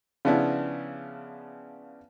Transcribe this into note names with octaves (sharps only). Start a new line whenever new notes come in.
C#3 F3 B3 D4 E4